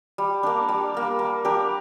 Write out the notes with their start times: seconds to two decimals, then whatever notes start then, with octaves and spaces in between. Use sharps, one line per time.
0.18 G3
0.43 A#3 D4
0.69 G3
0.94 A#3 D4
1.19 A#3
1.45 D4 G4 A#4